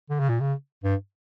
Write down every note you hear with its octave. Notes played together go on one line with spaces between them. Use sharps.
D3
C#3
A#2
C#3
G2